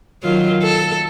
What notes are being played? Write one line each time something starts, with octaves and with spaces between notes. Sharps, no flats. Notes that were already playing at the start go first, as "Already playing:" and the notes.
D#3 F#3 F4
A4